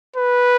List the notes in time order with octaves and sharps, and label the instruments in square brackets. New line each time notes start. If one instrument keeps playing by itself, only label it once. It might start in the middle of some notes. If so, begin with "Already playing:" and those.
[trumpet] B4